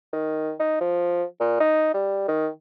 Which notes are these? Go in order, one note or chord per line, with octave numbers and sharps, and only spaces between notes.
D#3
D#4
F3
A#2
D#4
G3
D#3